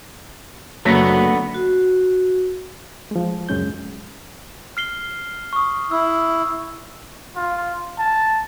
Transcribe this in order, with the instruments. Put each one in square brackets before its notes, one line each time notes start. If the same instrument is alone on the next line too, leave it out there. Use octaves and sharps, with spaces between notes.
[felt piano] F#1 A#6 B6 [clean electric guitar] D3 A3 B3 [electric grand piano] F#3
[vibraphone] F#4
[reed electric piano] F3 G#3
C#2 F#2 G#3 C#4 G6
[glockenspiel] F6 C7 G7
C#6 D#6
[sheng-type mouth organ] E4 [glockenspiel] E6
[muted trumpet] F4
A5